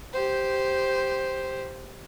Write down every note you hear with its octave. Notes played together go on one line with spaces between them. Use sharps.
G4 C5